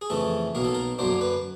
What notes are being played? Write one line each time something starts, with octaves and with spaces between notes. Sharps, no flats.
G#4
F2 C#3 E3 A3 A4
B1 B2 F#3 A#3 A#4
A4
A#4
F#2 D3 F#3 A#3 D4 C5
B4